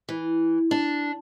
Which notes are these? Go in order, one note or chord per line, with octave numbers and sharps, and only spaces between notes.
E3
D4